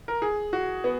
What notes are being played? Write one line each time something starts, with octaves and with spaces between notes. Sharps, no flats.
A#4
G#4
F#4
B3